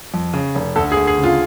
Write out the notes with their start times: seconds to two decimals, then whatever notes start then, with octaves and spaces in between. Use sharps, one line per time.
0.14 F2
0.34 C#3
0.55 F1
0.76 D2 A4
0.92 G#4
0.96 D2
1.07 G#4
1.18 C#3
1.24 F4